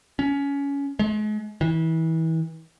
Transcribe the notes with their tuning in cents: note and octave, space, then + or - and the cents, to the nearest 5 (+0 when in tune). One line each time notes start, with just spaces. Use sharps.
C#4 +20
G#3 +40
E3 -30